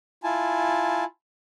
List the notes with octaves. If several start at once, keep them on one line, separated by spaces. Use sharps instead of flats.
E4 F4 G#5 A5